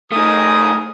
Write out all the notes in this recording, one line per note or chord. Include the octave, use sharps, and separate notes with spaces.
A3 D#4 G#4 A#4 D#6